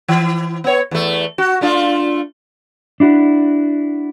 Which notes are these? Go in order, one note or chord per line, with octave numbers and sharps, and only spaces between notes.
E3
B3 C#5
E2 A3
F#4
A3 D4 F4
D4 E4 F#4